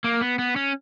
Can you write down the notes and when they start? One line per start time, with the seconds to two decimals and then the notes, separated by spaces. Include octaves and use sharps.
0.04 A#3
0.21 B3
0.39 B3
0.56 C#4